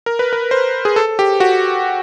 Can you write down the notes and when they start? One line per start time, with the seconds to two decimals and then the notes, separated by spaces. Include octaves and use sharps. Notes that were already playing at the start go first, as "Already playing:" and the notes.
0.06 A#4
0.19 B4
0.33 A#4
0.51 C5
0.85 G#4
0.96 A4
1.19 G4
1.40 F#4